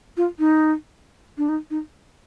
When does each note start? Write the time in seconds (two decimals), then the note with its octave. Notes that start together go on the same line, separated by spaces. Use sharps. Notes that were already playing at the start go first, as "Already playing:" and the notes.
0.17 F4
0.39 D#4
1.38 D4
1.49 D#4
1.70 D#4